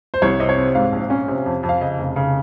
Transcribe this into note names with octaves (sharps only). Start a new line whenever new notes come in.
C5
C2 C#5
C3 D#5
C#5
C4
G#2 F5
A#1
C#4
C3
F2
F2
F5
C#3 D#5
F1
C#3